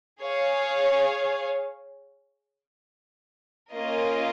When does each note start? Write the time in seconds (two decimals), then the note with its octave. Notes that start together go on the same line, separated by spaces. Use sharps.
0.23 G#4 C#5 F5
3.73 A#3 C#4 F4 A#4 D#5